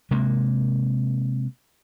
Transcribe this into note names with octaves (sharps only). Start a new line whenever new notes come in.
C3 G#3 A#3